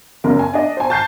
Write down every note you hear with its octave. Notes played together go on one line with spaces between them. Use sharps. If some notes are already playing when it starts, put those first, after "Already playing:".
F#1 F#2 A#4
G#5
D4 D#5
C5 G#5
A5 G6 C7